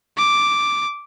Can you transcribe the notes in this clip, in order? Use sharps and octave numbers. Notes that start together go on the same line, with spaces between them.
D6